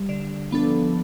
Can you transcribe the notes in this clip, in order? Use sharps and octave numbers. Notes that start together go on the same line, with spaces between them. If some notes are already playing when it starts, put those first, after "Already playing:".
Already playing: G3
D3
F3 B3 D4 A4